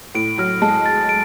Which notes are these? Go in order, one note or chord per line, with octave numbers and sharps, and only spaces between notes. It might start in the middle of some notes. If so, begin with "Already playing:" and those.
A2 D7
F#3 F6
G#3 A5
A6
D7